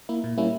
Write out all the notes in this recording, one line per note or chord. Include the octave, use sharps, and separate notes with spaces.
A#3 E4
A#2
G3 A#3 C#4 E4